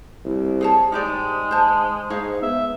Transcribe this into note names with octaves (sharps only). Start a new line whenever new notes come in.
C2
G#4 C#5 A5
G#2 G#3 D#4 G4 D5
C5 A5
G#2 D#4 C#5 F5
B3 E5